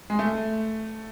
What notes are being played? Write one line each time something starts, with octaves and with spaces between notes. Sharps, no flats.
G#3
A3